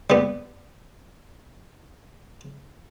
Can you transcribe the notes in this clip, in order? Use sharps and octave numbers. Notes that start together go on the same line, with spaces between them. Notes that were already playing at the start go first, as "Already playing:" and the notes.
G3 B3